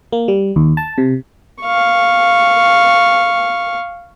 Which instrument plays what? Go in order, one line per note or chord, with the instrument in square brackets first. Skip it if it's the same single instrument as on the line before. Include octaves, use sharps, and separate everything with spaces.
[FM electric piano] A#3
G3
D#2
A5
C3
[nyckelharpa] F5 C#6